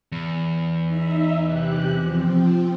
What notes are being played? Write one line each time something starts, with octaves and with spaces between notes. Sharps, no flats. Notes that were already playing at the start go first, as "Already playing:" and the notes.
E2
D#4 E5
C3 G4 F#6
F3 C4